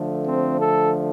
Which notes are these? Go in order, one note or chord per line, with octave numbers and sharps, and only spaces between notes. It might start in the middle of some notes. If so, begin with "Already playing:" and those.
Already playing: D3 F3 A3
C4
A4